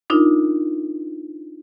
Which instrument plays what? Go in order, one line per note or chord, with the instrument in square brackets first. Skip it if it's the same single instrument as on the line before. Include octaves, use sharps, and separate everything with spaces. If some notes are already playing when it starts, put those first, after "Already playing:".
[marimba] D4 D#4 F4 A#4